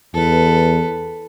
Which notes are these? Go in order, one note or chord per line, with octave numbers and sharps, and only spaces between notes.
E2 A4 B4